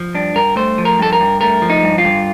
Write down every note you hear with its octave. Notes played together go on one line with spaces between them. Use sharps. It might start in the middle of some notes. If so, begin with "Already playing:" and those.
Already playing: F3
G2 D4
G2 A#4
A3 C5
F3
A#4
G2 A4
A#4
G2
A3 A#4
F3
D#4
G2
F4
G2